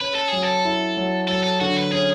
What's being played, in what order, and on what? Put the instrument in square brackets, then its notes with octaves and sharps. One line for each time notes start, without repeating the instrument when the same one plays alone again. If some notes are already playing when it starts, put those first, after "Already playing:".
[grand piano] C#4 [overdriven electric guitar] B4
[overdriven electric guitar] A4
[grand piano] F#3 [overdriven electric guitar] G#4
[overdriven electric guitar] A4
[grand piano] E4
F#3
[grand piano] F#3 [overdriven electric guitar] A4
[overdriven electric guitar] A4
[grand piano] D3 [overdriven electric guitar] F#4
[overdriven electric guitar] B4
[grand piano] C#4 [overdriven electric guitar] G#4